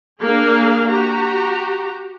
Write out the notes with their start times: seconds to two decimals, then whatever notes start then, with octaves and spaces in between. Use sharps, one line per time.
0.22 A#3 D4 G#4 A#4 F5
0.88 F#4 G4 A#5